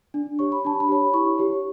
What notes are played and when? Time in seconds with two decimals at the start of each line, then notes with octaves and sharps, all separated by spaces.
0.14 D4
0.39 G4 C#5 C#6
0.52 B5
0.65 D4 A5
0.80 B5
0.88 G4 C#5
1.13 E4 C#6
1.38 G4 C#5